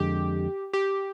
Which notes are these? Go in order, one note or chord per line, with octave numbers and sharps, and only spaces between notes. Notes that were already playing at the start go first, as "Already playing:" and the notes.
Already playing: F2 D3 G#3 G4
G4